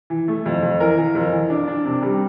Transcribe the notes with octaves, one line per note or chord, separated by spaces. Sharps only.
E3
A3
F2
F2
E3 A#4
E3
F2
E3
D4
D4
C3
G3